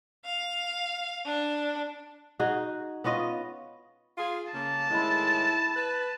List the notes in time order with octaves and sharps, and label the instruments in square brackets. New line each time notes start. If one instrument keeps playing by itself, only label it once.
[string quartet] F5
D4
[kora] D#4 F#4 G#4
B3 C#4 F4 D#5
[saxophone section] F4 G#4
[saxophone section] C#3 A#3 [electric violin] A5
[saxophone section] A2 D#3 G#3 [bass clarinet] E4
[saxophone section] B4